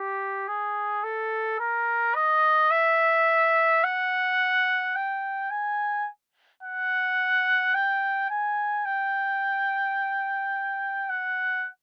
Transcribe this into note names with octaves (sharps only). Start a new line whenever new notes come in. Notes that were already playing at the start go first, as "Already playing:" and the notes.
Already playing: G4
G#4
A4
A#4
D#5
E5
F#5
G5
G#5
F#5
G5
G#5
G5
F#5